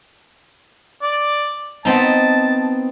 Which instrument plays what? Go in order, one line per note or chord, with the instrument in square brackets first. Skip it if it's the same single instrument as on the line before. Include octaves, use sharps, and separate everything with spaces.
[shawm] D5
[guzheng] B3 C4 D#4 [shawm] A5